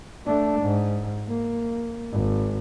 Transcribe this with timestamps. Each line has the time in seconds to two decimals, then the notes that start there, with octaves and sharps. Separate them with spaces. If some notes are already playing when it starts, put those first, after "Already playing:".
0.26 A3 D4
0.61 G#2
1.29 A#3
2.12 G#1